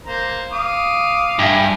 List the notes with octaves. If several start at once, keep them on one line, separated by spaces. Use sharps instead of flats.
A#3 C5 A#5
F5 D6 D#6
G2 E5 G#5